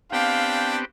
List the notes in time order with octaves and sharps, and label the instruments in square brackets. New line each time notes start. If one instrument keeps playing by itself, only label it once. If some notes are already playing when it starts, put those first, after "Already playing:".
[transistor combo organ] B3 C4 G4 [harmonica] D4 G5 [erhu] F5